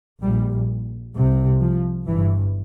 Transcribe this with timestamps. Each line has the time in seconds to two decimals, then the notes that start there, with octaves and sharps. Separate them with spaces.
0.21 A#1 A#2 G3
1.15 C2 C3
1.61 F3
2.07 G1 G2 E3